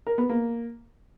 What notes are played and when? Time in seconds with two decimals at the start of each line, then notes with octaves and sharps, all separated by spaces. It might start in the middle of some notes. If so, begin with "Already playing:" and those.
0.07 A#4
0.18 B3
0.29 A#3